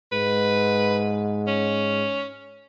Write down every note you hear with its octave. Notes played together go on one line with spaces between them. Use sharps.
G#2 B4
C#4